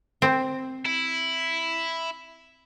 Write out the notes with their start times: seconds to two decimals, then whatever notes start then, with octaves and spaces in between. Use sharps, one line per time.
0.22 C4
0.85 E4